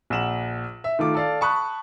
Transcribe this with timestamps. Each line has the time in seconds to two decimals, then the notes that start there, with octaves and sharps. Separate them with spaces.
0.10 A#1 F#5 E7 F#7
0.84 E5
0.99 D#3 A3 F4 D6
1.15 A4 D5 F5
1.41 A5 B5 C#6 D#6 F#6